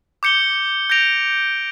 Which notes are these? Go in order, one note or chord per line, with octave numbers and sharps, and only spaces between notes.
D6 G6 C#7 G7
G6 A#6 D7 F7